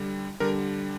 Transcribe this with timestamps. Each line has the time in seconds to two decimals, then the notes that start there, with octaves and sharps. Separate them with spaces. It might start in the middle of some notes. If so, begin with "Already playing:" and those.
Already playing: D3 G3
0.40 D3 G3 A#4